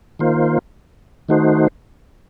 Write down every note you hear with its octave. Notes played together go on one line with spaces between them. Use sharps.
D#3 A#3 F4 C5
D#3 A3 D#4 F#4 C5